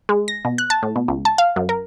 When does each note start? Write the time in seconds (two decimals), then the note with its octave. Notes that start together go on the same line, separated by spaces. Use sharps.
0.09 G#3
0.28 A#6
0.45 B2
0.58 F#6
0.70 A5
0.83 A2
0.96 B2
1.08 C#2
1.25 A5
1.38 F5
1.56 F#2
1.69 A#4